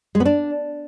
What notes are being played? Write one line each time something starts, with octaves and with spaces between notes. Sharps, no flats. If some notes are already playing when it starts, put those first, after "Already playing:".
G#3
B3
D4